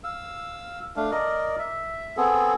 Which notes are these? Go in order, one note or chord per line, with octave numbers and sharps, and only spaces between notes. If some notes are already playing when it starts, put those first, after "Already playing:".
F5 E6
A3 D4 F5
A#4 D5 D#5
E5
B3 C4 G#4 A4